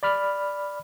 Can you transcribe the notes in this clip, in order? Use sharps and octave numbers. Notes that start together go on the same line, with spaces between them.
D5 B5 F6